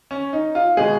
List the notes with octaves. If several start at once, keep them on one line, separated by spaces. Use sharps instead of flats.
C#4
D#4
F4
B2 G#3 G#4